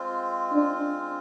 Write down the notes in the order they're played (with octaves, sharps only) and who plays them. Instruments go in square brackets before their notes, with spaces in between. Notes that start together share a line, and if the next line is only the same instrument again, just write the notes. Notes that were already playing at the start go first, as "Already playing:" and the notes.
Already playing: [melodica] G#3 C4 F4
[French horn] D4